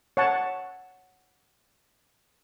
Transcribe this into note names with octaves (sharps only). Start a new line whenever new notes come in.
C#5 F#5 A5